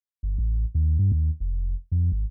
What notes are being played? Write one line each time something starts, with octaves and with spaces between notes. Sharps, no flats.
G1
A1
D#2
G2
D#2
F1
F2
G#1